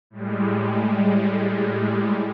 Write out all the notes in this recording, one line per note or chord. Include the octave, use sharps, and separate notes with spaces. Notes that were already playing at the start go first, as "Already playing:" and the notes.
A2 G3 G#3